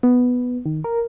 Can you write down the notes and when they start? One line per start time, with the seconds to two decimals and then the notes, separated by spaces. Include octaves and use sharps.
0.03 B3
0.66 D#3
0.84 A#4